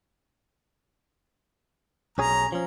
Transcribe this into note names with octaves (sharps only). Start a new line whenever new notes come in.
B1 C#4 G#4 A#5
F3 C#4